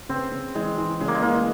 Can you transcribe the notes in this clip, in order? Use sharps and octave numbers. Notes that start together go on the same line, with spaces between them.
C#3 C4
C#3
E3 G#3
E3
C#3 G#3
A#3
G#3
E3 A#3
G#3